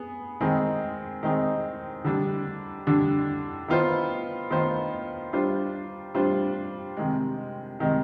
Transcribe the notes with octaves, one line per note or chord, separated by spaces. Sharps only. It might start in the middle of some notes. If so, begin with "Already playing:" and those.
Already playing: B3 G#4
D#3 G#3 C4 D#4 G#4
D#3 G#3 C4 D#4 G#4
D3 G3 D4
D3 G3 D4
D#3 B3 F4 C5
D#3 B3 F4 C5
G3 D4 F4 C5
G3 D4 F4 C5
C3 D#3 G#3
C3 D#3 G#3